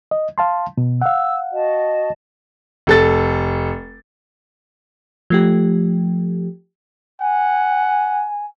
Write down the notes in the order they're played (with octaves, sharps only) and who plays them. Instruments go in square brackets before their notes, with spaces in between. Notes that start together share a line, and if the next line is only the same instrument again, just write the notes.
[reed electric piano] D#5
F5 A5 C6
B2
[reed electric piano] F5 F#5 [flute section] E6
[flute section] F#4 D#5 A5
[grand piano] F1 A4 A6
[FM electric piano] F3 A3 G4
[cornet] F#5 [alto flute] G#5